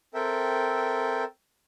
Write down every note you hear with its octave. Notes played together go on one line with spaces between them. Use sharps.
C4 A4 A#4 E5 G5